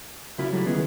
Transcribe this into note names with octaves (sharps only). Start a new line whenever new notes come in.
F#2 C#3 E4 F4
A2 F#3 G3
C#2 D#3 B3 G#4